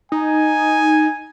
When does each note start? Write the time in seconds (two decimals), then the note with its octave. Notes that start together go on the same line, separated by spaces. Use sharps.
0.12 D#4 G#5